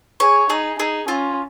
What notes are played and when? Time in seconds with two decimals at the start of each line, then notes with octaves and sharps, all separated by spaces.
0.20 G#4 C#5
0.50 D#4 G#4
0.79 D#4 G#4
1.08 C#4 F4